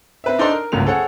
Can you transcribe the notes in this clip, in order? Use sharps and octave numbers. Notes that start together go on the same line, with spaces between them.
C4 B4 E5
D4 D#4 A4 C5 C6
A#4
G1 C#2 F#2 A3 A#3 F7
G#4 A4 C5 C#5 F#5